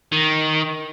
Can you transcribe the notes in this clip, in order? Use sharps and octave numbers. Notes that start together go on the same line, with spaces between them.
D#3